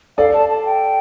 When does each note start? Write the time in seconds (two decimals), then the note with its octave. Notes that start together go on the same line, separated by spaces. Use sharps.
0.18 A4 D5 F5
0.34 A5
0.49 A5
0.66 G5